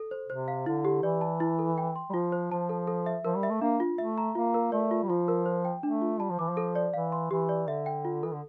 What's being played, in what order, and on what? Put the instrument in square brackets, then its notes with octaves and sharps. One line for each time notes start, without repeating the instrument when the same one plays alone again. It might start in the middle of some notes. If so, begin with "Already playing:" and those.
Already playing: [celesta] A4
C5
[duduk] C3 [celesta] C5
[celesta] F5
[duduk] D3 [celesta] E4
[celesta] G4
[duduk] E3 [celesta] D5
[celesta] A5
E4
A4
G5
C6
[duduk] G3
[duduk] F3 [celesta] F4
[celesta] C5
[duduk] F3 [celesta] A5
[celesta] A4
A4
E5
[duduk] F3 [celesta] A#4
[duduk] G3
[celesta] E5
[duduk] A3
[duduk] A#3 [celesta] D4
[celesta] F4
[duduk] A3 [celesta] E5
[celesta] A#5
[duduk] A#3 [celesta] F4
[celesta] A#4
[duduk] A3 [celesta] D5
[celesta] F4
[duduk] G3
[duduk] F3 [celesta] F4
[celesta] A#4
C5
G5
[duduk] A3 [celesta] D4
[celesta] F4
[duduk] G3 [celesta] A5
[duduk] F3
[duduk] E3 [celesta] D6
[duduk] F3
[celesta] A4
D5
[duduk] E3 [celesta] F5
[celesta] C6
[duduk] E3 [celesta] G4
[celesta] D5
[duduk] D3 [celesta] E5
[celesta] G5
F4
[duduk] E3 [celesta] A4
[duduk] D3